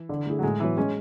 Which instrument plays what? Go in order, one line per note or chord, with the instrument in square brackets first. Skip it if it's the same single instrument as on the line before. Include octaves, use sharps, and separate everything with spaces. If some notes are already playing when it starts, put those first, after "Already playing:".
Already playing: [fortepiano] E3
[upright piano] D3
A3 E4 G#4
[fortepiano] F#3
[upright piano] A2 [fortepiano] G#3
[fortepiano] E3 [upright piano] F#3 B3
[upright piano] G#3 [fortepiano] C#4